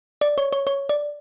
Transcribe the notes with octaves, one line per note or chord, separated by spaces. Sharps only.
D5
C#5
C#5
C#5
D5